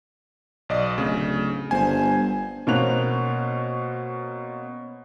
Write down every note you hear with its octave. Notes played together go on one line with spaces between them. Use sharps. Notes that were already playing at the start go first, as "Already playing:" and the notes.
B1 D5 D#5
D1 C#3
G1 C5 G#5
B2 A#3 C4 C#4 F#6 F7